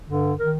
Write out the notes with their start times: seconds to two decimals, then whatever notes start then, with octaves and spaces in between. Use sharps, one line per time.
0.08 G2 D3
0.38 D#3 A#4